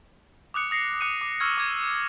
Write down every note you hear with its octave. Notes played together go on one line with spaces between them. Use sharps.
D6 D#6 F#6 C#7
D#6 A#6 C7 C#7
D6 F#6 C#7 D#7
D6
C#6 E6 F6 G#6
D6 G#6 D#7